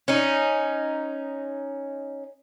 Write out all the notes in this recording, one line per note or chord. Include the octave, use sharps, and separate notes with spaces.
C#4 D#4